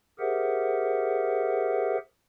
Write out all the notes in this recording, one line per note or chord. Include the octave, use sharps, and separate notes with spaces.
G4 G#4 A#4 C5 E5 F#5